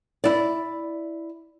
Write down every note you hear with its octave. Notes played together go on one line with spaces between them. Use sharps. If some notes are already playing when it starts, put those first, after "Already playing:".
E4 D5